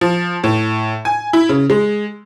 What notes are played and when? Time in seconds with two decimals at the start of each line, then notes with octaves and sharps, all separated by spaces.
0.01 F3
0.44 A2
1.05 G#5
1.33 E4
1.49 C#3
1.70 G#3